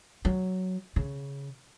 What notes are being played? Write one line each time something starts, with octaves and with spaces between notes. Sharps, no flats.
F#3
C#3